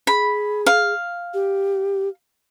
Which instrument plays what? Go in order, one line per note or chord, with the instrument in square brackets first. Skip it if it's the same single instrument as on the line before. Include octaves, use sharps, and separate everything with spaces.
[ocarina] G#4 [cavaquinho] B5
[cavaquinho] F5
[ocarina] G4